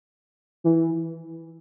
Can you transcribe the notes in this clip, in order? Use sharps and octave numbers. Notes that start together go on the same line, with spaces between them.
E3